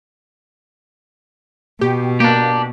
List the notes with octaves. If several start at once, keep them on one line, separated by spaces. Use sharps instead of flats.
B2 G4
A#3 D4 G4